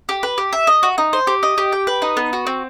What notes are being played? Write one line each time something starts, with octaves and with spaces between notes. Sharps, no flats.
G4
B4
G4
E5
D#5
F#4
D#4
C5
G4
D#5
G4
G5
B4
D#4
B3
F#4
C4